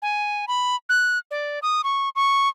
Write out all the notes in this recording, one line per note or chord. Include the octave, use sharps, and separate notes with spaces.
G#5
B5
F#6
D5
D#6
C#6
C#6